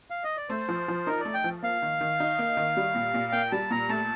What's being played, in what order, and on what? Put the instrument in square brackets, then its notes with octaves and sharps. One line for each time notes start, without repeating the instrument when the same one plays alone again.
[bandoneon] F5
D#5
D5
[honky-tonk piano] A3 [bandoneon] C5
[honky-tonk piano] F3
F3
[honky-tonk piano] D#4 [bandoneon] A#4
[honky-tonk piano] A3 [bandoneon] D5
[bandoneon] G5
[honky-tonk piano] F3
[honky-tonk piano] A#3 [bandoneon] F5
[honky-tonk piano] D#3
D#3
D#4
A#3
D#3
G3
A#2
A#2
[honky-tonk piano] A#3 [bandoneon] G5
[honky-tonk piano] G3 [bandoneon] A5
[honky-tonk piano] A#2 [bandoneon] A#5
[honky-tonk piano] A3 [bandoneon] A5